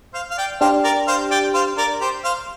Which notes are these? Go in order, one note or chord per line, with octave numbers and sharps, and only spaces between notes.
C5 F5
F5
D5 G5
D4 G4 C5 F5
A#4 D5
C5 F5
D5 G5
C5 F5
A#4 D5
G4 C5
C5 F5